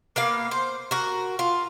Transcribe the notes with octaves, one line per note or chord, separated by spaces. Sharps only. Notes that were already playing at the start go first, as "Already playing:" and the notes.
A#3 B3 F5
C5
F#4 A#4
F4